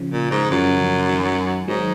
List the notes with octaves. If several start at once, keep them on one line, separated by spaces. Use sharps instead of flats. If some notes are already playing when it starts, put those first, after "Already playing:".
Already playing: C#3 F3
A#2
G#2
F#2 C#3 F3
C#3 F3
D#3 F#3
G#2 D#3 F#3